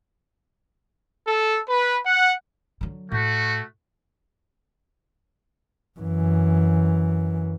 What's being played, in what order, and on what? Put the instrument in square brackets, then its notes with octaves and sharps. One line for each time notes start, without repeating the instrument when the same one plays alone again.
[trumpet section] A4
B4
F#5
[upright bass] D3 F#3
[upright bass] A2 [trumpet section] A3 F#4
[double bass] F#2 E3